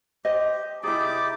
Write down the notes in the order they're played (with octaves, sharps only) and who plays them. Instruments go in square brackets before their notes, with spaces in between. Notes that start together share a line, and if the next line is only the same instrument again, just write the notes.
[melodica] G4 [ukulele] C5 D#5
[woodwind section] C3 D6 [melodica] D#4 G4 D5 [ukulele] E4 G#4